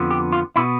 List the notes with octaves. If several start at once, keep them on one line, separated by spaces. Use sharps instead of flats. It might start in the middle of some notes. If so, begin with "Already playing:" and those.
Already playing: F2 D3 F3 B3
G4
F4
B2 B3 E4